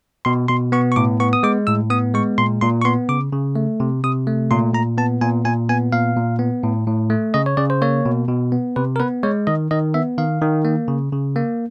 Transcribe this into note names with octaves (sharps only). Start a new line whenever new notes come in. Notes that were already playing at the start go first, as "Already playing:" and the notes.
B2 C6
B2 C6
B3 C#6
C#6
A2 D6
B3 C#6
D#6
G#3 D6
A2 E6
B3 D#6
G#3 C#6
A#2 C6
A#2 C6
C#6
B3 C6
C#3 D6
C#3
A3
C3
C3 D#6
A3
A#2 C6
A#2 A#5
B3 A5
A#2 G#5
A#2 G#5
B3 G#5
A#2 F5
A#2
B3
A2
A2
A3
C#3 D#5
C#5
C#3 D5
C5
A#3 C#5
B2
B2
B3
C3 B4
A#4
B3 B4
G#3 C#5
D#3 D#5
D#3 D#5
B3 E5
D#3 F5
D#3
A#3
C#3
C#3
A#3